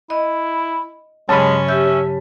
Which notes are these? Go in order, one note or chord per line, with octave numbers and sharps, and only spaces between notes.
E4 D#5
G2 C#3 F#3 G#3 C#4 A5 B5
G4 E5 G6